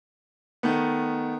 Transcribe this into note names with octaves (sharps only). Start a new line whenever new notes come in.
D#3 A3 B3